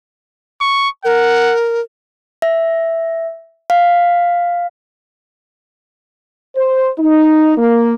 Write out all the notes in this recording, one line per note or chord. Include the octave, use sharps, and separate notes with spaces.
C#6
A#4 F#5
E5
F5
C5
D#4
A#3